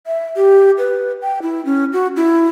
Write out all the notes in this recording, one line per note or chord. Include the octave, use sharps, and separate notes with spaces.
E5
G4
B4
G5
E4
C#4
F#4
E4